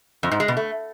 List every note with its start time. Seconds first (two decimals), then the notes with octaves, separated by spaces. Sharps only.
0.23 F2
0.31 G#2
0.40 G#3
0.48 B2
0.57 A3